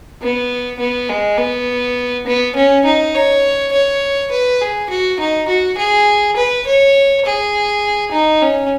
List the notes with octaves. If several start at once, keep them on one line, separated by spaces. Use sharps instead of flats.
B3
B3
G#3
B3
B3
C#4
D#4
C#5
C#5
B4
G#4
F#4
D#4
F#4
G#4
B4
C#5
G#4
D#4
C#4